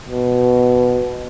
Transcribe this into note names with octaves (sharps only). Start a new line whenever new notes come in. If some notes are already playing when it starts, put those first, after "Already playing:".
B2